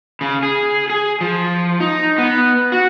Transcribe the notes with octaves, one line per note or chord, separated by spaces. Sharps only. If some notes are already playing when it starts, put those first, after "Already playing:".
C#3
G#4
G#4
F3
D#4
B3
F#4